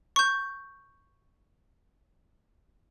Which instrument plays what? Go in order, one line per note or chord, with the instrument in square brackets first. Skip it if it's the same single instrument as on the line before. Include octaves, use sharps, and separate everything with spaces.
[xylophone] C#6 G6